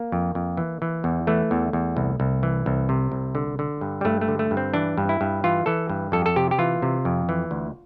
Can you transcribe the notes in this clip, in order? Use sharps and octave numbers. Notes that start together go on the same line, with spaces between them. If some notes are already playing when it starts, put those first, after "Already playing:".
Already playing: A#3
F2
F2
E3
E3
E2
E3 A3
E2
E2
C2
C2
E3
C2
C3
C2
D3
D3
G2
G3
G2 A3
A3
D3
A3
G2
C4
E3 D4
G2
E4
G2
E3 F4
E3 A4
G2
F2 A4
A4
C3 G4
G4
E3 F4
C3
F2
E3
D2